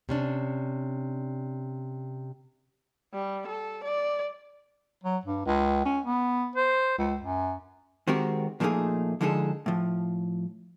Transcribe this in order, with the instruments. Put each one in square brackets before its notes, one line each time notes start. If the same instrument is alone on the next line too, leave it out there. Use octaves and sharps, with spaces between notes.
[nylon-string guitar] C3 C#4 D4
[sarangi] G3
A4
D5
[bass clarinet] F#3
G2
C#2
C#4
B3
C5
C#2
F#2
[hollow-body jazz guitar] D#3 G#3 C4 F#4 G4 A#4
A#2 F3 A3 A#3 D#4 G#4
D3 F3 G#3 D#4 G#4 A4
A2 F3